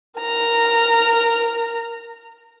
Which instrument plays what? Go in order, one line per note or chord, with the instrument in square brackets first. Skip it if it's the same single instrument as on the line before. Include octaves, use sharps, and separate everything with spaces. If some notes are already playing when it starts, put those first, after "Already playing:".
[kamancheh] A#4 A#5